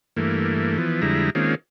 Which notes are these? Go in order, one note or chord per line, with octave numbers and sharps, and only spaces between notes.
G2 E3 A3 A#3
E3 F3 B3
F2 D3 G3 G#3 E4 A#5
D#3 G#3 A#3 C4 C#4 F4